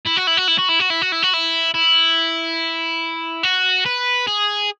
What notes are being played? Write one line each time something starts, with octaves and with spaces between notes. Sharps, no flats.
E4
F#4
E4
F#4
E4
F#4
E4
F#4
E4
F#4
E4
F#4
E4
E4
F#4
B4
G#4